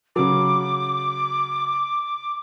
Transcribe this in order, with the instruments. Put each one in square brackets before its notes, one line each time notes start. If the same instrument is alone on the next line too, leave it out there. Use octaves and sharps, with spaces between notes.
[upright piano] C#3 F#3 [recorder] D6